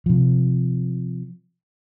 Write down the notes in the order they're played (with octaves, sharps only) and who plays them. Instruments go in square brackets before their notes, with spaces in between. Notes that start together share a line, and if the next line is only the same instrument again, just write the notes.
[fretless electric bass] C3 F3